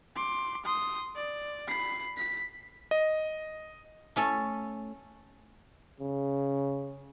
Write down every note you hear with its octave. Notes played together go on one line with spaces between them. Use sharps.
C6 D6
C6 D#6
D5
B5 C7
B6
D#5
A3 C#4 A4
C#3